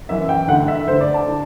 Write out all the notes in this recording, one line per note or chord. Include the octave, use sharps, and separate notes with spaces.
F#2 E3 E5
G5
D2 D3 F#5
E5
D2 D3 C5
D5
A5
D3